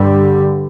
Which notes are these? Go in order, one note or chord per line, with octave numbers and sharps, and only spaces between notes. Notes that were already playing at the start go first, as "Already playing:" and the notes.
Already playing: G2 D3 G3